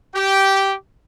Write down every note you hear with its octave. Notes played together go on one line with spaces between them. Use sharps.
G4 G5